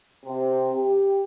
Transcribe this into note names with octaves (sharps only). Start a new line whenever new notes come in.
C3
G4